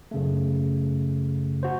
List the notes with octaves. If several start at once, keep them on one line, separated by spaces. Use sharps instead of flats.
F#2 C#3 A3
F#4 C5